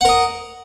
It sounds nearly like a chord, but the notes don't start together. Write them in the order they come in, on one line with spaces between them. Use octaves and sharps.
F#5 A#4 D#5